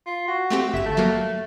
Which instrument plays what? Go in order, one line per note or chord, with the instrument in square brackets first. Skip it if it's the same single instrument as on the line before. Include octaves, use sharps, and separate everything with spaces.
[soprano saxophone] F4
F#4
[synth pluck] A3 C4 G4
[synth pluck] G1 E7 [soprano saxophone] E5
[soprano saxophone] A3
[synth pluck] F#3 A#3